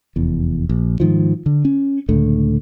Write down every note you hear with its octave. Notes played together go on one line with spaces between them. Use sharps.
F1 E2
A#1
G#2 D#3 F3
D3
C#4
C#2 A2 D3 A3